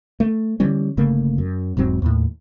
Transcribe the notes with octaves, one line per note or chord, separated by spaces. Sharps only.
A3
D3 E3 G3 C#4
G1 C#3 A3 A#3
F#2
E1 G#2 F#3 C4
D#2 A2